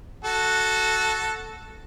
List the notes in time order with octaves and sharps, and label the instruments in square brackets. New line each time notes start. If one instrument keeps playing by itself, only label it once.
[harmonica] F#4 A4